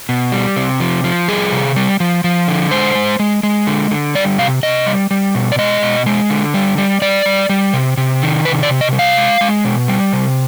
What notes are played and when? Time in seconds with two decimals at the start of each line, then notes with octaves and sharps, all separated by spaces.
0.09 B2
0.32 G3
0.56 C3
0.80 F3
1.04 F3
1.28 G3 G#4
1.52 C3
1.76 G3
2.00 F3
2.24 F3
2.48 D3
2.71 G#3 C5
2.95 G#3
3.19 G#3
3.43 G#3
3.67 D3
3.91 D3
4.15 G3 D5
4.38 C3 F5
4.63 C3 D#5
4.86 G3
5.11 G3
5.35 B2
5.52 D5
5.58 G#3 D#5
5.83 B2
6.06 G#3
6.30 D3
6.54 G3
6.78 G3
7.02 G3 D5
7.26 G3
7.49 G3
7.73 C3
7.97 C3
8.22 D#3
8.45 C3 B4
8.63 D5
8.69 C3
8.81 D#5
8.93 G3
8.99 F5
9.17 G#3
9.41 G#3
9.64 B2
9.88 G3
10.13 C3